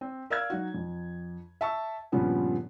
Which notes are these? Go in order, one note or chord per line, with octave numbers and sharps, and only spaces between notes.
C4
A#4 D5 F5 E6 F6 G#6
F#3 D#4 F#4
F2
E5 A5 C#6 E6
G2 A#2 C#3 F3 B3 C#4